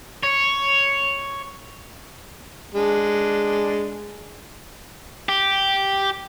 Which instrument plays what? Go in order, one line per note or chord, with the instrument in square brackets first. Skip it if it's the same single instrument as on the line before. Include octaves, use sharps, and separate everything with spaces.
[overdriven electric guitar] C#5
[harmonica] G#3 D4
[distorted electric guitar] G4